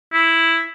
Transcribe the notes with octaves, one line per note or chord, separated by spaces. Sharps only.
E4